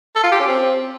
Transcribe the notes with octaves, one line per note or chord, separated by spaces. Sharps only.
A4
F4
G4
C#4
C4